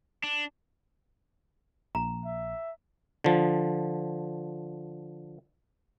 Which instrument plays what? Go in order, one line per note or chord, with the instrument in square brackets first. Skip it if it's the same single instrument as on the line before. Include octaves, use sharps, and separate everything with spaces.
[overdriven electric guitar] D4
[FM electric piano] A#1 [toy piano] A#5
[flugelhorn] E5
[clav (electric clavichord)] D3 F3